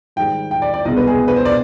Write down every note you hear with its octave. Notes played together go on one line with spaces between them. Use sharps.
G#2 D#3 G3 G5
G5
D5
D5
C2 B2 G#3 D#5
B4
G#4
B4
C5
D5